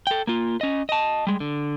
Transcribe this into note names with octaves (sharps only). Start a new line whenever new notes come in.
A4 G5
A#3 F4
C#4 D#5
D#5 A5
G3 G#3
D3